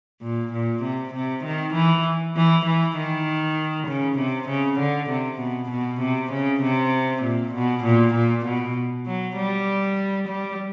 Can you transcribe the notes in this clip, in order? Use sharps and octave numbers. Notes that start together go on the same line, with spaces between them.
A#2
A#2
C3
C3
D#3
E3
E3
E3
D#3
C#3
C3
C#3
D3
C3
B2
B2
C3
C#3
C3
A#2
B2
A#2
A#2
B2
F#3
G3
G3